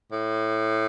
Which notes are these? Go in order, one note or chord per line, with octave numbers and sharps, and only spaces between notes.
A2